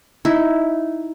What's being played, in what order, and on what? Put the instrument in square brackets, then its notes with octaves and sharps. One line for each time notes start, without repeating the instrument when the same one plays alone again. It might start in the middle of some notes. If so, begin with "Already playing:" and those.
[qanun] D#4 E4